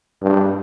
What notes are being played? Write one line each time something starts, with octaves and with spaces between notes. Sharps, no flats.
G2